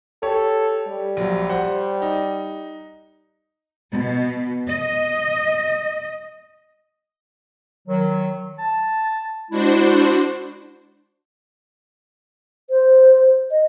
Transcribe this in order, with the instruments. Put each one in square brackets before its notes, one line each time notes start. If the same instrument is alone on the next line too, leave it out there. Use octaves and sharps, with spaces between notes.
[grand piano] G4 C#5 [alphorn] A4
[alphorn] G3
[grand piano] A#1 F#3
C5 F#5
D#4
[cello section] B2
D#5
[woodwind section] D#3 F#3
A5
[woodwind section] G#3 E4 [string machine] D4 F#4 C5
[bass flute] C5
D#5